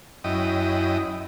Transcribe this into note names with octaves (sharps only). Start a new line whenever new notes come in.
F#2 E4 D#5 G5 D#6